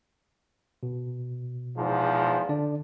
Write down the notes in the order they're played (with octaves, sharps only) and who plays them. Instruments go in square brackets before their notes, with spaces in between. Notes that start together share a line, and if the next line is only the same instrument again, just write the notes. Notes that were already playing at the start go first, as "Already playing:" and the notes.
[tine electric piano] B2
[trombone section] E2 G#2 F3
[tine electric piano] D3 D4 D5